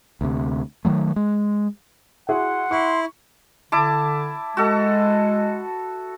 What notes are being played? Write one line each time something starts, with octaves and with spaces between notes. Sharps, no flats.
D2 C3
D#3 F3 F#3 A3
G#3
E4 F#4 G#4 F#5 C6
E4 C6 C#6
D3 E4 A5 D6
G#3 F#4 A4